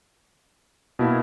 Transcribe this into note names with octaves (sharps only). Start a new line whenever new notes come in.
B2 A#3 E4